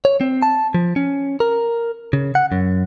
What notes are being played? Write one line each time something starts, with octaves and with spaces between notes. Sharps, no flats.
C#5
C4
A5
F3
C#4
A#4
C#3
F#5
F#2